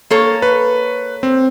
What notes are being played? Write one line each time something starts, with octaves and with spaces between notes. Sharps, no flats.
A#3 A4 C#5
B4
C4